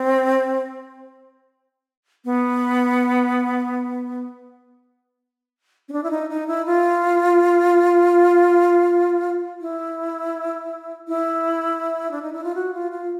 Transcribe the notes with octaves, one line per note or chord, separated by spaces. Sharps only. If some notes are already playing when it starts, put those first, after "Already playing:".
Already playing: C4
B3
C#4
D4
E4
D#4
D#4
E4
F4
E4
E4
D4
D#4
E4
F4
F#4
F4
F4